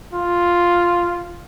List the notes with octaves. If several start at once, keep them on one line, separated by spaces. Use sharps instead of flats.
F4